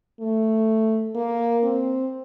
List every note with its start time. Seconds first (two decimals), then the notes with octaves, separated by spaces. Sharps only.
0.20 A3
1.15 A#3
1.63 C4